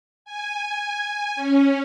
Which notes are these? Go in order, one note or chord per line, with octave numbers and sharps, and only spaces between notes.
G#5
C#4